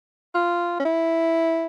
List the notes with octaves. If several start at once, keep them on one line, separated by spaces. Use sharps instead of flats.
F4
C#4
E4